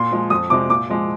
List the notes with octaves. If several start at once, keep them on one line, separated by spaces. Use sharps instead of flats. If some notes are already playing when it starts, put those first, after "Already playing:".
Already playing: A#2 C6
F3 G#3
F2 D#6
C3 F3 G#3 D6
A#2 D6
F3 G#3